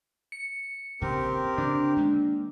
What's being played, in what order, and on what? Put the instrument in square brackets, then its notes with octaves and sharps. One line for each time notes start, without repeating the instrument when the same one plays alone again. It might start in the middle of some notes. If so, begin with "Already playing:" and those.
[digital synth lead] C#7
[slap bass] D#1 A#1 C#3 [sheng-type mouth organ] C4 G4 A#4
[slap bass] C#3 [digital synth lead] D4
[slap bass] D#3 G#3 A#3